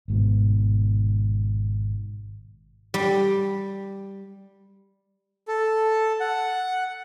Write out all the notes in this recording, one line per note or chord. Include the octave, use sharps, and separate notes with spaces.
G#1 G#2 B2
G3
A4
F#5